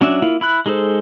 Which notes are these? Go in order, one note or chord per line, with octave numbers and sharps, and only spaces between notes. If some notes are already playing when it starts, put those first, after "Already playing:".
F#3 C#4 D4 E5
A#3 E4 F4
E4 B5 F#6
G#3 D#4 G#4 A4 C5